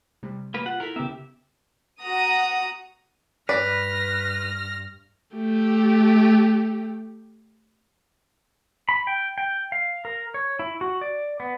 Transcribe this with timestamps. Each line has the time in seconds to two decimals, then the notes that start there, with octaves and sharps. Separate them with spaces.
0.23 C3 G3
0.54 A#3 B4
0.66 F4 F#5
0.80 E4 A4 A#4 B6
0.96 C#3 B3 G4 E5
2.03 F#4 F#5 A#5 D#6
3.49 G2 B4 D5 F6 A#6
5.35 A3 G4
8.89 B5
9.07 G5
9.38 G5
9.72 F5
10.05 A#4
10.34 C#5
10.59 E4
10.81 F#4
11.01 D5
11.40 B3